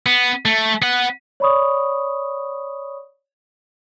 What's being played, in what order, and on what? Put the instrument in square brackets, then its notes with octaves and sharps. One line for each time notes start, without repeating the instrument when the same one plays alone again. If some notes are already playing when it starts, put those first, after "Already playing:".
[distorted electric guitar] B3
A3
B3 F#5
[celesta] C#5 D5 B5 C#6 D#6